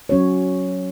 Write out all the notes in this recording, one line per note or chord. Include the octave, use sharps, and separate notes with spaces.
F#3 C#4 F#4 C#5